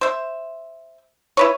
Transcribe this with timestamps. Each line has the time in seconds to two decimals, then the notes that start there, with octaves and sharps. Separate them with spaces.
0.01 C5 E5
1.37 E4 B4 C#5